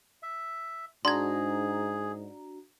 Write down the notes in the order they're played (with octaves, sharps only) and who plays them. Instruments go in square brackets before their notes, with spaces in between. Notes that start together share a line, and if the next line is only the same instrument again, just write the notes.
[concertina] E5
[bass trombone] G#2 [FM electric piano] D4 F#4 A#5 [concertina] G#4 [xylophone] C6 G#6